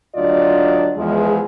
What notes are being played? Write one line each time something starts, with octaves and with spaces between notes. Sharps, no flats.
D2 F#3 D4 F4 D5 D#5
E2 F3 G#3